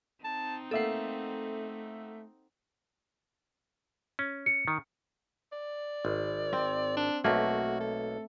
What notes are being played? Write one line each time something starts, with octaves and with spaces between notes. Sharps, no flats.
C4 D#4 A5
A3 A#3 A4 E5 F#5 C7
C#4
C#7
D#3
D5
G#1
C4
D4
B1 A3 A#3 F#4
A4